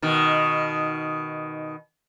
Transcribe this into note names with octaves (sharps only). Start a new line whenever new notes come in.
B2 D#3